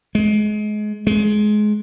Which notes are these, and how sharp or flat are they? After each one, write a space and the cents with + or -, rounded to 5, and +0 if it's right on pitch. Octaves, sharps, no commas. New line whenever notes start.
G#3 +30
G#3 +20